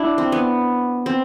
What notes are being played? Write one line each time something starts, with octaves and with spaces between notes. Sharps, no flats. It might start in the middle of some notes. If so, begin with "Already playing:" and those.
Already playing: D4 E4 F#4
C4
B3
C4